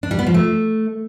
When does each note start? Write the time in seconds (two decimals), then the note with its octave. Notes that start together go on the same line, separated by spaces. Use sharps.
0.03 D4
0.11 G3
0.19 B3
0.27 F3
0.34 A3